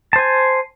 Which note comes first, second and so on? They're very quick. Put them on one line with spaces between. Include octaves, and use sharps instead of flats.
A5 C5 G#5